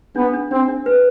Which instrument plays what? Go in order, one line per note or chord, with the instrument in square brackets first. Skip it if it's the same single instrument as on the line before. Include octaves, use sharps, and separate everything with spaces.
[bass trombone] B3 [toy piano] D4
[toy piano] D4
[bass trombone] C4 [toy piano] D4
[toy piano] D4
B4